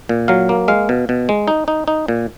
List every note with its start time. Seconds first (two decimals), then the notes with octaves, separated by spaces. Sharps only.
0.09 A#2
0.28 F#3 F5
0.49 A#3
0.68 G#3 F5
0.89 B2
1.09 B2
1.29 G#3
1.48 D#4
1.68 D#4
1.88 D#4
2.08 A#2